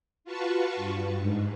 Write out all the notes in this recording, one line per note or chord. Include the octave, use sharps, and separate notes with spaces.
F4 F#4 B4 A5 C#6
G2
G#2